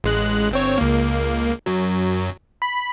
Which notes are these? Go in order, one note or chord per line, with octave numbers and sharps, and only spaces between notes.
A1 G#3 F#6
G1 C4 C#5
C#2 A#3
F#2 F#3
B5